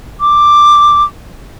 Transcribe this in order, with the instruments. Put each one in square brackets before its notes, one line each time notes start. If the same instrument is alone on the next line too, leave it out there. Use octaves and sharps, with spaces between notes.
[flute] D6